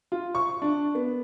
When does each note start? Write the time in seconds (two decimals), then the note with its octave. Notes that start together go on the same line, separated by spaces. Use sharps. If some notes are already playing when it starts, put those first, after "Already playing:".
0.12 F4
0.35 C#6
0.62 D4
0.95 B3